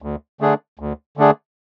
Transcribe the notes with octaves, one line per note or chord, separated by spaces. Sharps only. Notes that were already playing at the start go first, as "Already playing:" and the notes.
D2
D3 A3 D4 G#4
D2
D3 A3 D4 G#4